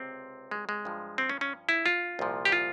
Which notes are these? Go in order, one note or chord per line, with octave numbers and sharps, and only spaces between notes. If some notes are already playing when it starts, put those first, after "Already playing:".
Already playing: C#2 C3 C4
G#3
G#3
G2 F3
C4
C#4
C#4
E4
F4
C2 A#2 F3
G4
F4